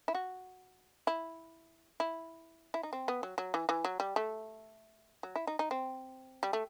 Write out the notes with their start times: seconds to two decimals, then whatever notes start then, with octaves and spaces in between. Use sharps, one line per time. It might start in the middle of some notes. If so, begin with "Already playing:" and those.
0.08 E4
0.14 F#4
1.07 E4
2.00 E4
2.74 E4
2.83 D#4
2.93 C4
3.08 B3
3.23 F#3
3.38 F#3
3.54 E3
3.69 E3
3.85 F#3
4.00 G3
4.16 A3
5.23 F#3
5.36 E4
5.47 D#4
5.59 D#4
5.71 C4
6.43 G3
6.53 A3